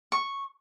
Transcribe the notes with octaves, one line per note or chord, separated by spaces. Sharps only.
C#6